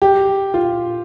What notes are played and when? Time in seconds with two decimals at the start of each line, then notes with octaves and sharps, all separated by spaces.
0.02 G4
0.54 F4